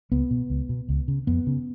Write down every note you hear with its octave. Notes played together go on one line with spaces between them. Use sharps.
C#2 B3
B2
C#2
B2
C#2
C#3
F2 B3
C#3